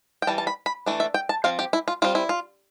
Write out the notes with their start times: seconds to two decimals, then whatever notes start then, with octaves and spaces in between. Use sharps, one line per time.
0.22 G5
0.27 E3 G3 A5
0.38 A5
0.47 B5
0.66 B5
0.86 E3 A3 D4
1.00 E5
1.14 G5
1.29 A5
1.44 F3 C4 F5
1.59 G4
1.73 E4
1.88 F4
2.02 G3 C4 F4
2.15 E4
2.29 F4